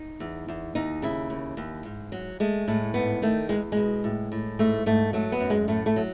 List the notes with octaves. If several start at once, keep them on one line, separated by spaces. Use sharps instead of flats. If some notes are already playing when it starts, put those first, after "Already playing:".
Already playing: D#4
E2
E2
D#2 D#4
C#3 E4
D#2
D#2
G#2
F#3
G#3 A3
A2 A3
G#2 B3
D#3 A3
E2 G#3
B2 G#3
A2
A2
G#2 A3
G#2 A3
F#3 A3
B3
F#2
G#3
A2 A3
A3
F#3